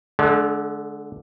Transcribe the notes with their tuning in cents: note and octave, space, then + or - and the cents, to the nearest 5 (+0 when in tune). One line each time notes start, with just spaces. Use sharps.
D3 +0 G#3 +40